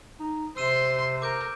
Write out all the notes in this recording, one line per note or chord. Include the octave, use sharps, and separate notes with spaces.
D#4
C3 C5 C6 E6 D#7 E7
A#4 D6 G6 D7